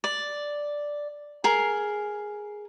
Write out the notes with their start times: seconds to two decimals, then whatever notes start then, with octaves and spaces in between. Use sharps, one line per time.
0.04 D5
1.44 G#4 A#4